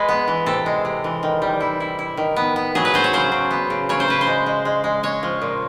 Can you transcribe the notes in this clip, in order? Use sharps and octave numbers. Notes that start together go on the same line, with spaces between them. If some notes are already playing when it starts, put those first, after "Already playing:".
Already playing: G#3 B4
B3
E3
C3 A4
G#3
C3
E3
D#3
G3
E4
E4
E4
D#3
B3
B3
F#3 G#4
B4
F#3 C5
C#5
C#3 C5
C#3
B3
C#3
C#3 C#5
C5
C#3 B4
C5
G#3
G#3
G#3
G#3
G#3 C#5
F3
A#2